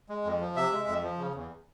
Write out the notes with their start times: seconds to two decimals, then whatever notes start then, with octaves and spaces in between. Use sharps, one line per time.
0.09 G#3
0.25 F2
0.40 F3
0.56 C3 E5
0.72 G#3
0.88 F2
1.03 F3
1.19 C#3
1.36 E2